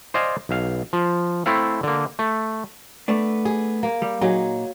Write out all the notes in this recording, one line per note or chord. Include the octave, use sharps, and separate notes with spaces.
C5 D5 D#5 F5 G#5
B1 F5
F3
A3 C4 E4 A4 F5
D3 A#3
A3
A3 B3 D4
G#4
A#3
G3
A#2 F#3 D#4 G#4